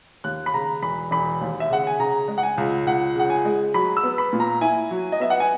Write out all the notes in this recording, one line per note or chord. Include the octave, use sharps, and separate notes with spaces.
D#2 F#6
B5
C#3 A#5
E1 B5
E1 B5
D#2
E5
C#3 F#5
G#5
C#3 A#5
G#3
F#5
G#5
C#2
C#2 F#5
C#3 F#5
G#5
G#3
F#3 B5
E6
B3
B5
A#2
A#5
E4 G#5
F#3
D#5
B3 E5
F#5
G#5